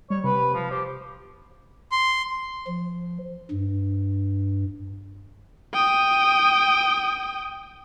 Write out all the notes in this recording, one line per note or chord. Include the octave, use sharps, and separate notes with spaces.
G3 C#5
C3 B4
F3
G4 C5
C6
F3
G2
G5 D#6